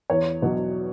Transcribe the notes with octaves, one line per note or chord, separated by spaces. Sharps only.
E2 C#5
B2 F#3